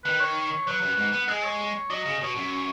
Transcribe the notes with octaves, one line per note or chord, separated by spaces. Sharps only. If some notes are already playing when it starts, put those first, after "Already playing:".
D#3 B4
C#5
F#3 B4
F#2
G#2
B3
G#3 G#4
C#5
F#3 D#5
C#3
B2 C#5
F#2